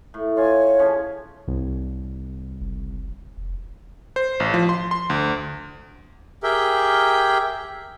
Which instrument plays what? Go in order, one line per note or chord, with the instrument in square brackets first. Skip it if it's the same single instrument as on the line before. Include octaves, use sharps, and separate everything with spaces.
[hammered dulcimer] A2
[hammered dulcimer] F4 G#5 [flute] C#5
[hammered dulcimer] C#3 F3 C#4
[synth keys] C2
[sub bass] F#1
F1
[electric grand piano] C5
A1
F3
C6
C6
D2
[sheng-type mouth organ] G4 G#4 A#4 E5 G5